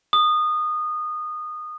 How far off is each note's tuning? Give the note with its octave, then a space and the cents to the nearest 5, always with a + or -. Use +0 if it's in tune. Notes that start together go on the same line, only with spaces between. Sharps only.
D#6 -20